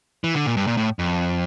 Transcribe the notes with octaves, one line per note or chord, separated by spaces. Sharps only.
E3
D3
A#2
G2
A#2
A2
F2